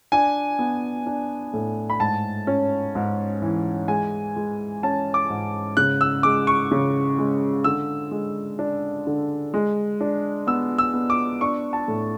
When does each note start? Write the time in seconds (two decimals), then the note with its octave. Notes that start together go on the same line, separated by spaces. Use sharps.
0.12 D4 G#5
0.59 B3
1.06 D4
1.53 A2
1.90 B5
2.00 G#2 A5
2.47 C#4
2.95 G#2
3.42 E3
3.88 G#3 G#5
4.36 G#3
4.83 C#4 A5
5.14 D6
5.29 G#2
5.77 C#3 F#6
6.01 E6
6.23 G#3 D6
6.47 C#6
6.72 C#3
7.18 G#3
7.64 D3 E6
8.11 G#3
8.59 D4
9.07 D3
9.54 G#3
10.01 D4
10.47 B3 E6
10.78 E6
10.94 B3
11.10 D6
11.41 D4 C#6
11.73 A5
11.88 A2